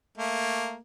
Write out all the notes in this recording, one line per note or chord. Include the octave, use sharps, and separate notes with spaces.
A3 A#3